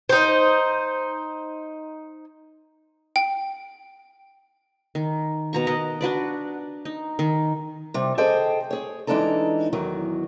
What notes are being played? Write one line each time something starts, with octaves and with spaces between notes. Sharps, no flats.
D#4 C5
G5
D#3
B2 A#5 C#6
A#4 D#5 F#5
D4 F#4 B4 D5
D#4
D#3
C3 G3
G#4 A4 C5 D#5 G5 A5
G#4 C#5
E3 G#3 D4 D#4 A4 A#5
E2 D#3 F#3